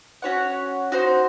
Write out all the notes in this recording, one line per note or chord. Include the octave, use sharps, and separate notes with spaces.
C#4 F#4 C#5 F#5
D#4 F#4 C5